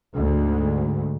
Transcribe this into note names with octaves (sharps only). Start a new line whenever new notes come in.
D2 G#2